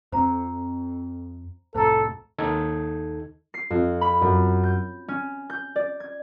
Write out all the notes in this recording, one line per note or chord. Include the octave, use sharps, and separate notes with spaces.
F2 A#3 C4 C5 A#5
C2 F2 A2 A4 C5 A#5
D#2 D#4 A4 G#6
C7
F2
B5
F#2
G6
C#4
G6
D5
G#6